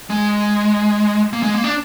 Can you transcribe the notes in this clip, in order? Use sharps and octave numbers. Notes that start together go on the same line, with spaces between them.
G#3
A#3
G#3
A#3
D4